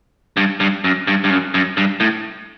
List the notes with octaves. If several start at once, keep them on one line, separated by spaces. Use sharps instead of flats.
G2
G2
F#2
G2
G2
F#2
F#2
G2
A2